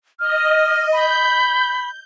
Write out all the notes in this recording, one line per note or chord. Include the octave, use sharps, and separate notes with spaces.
D#5 F6
B5 G6